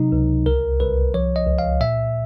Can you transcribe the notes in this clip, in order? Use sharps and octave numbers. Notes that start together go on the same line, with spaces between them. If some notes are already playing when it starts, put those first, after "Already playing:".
Already playing: C3 F#3 D#4
C#2
C2 A#4
C2 B4
F3 C#5
D#5
C#2
F5
A#2 E5